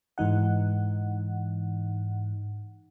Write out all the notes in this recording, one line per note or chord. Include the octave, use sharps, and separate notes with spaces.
G#2 E3 D#4 F#5